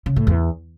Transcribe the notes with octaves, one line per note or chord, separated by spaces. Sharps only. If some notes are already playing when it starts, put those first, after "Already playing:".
C#3
A2
E2